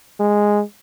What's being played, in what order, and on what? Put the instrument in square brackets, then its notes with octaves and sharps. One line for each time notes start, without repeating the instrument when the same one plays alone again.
[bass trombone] G#3